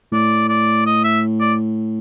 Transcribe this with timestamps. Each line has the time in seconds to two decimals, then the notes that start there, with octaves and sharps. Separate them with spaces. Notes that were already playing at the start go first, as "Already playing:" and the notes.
0.12 A2 D5
0.49 D5
0.86 D#5
1.04 E5
1.40 D5